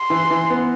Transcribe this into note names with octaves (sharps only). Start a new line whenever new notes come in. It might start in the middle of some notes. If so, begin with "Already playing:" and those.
Already playing: C6
E3
E3
B3